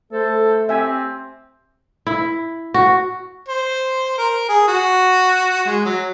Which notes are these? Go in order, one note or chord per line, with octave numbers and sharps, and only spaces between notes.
A3 A4 C5
C4 G4 E5 G#5
E4
F#4
C5
A#4
G#4
F#4
G#3
F#3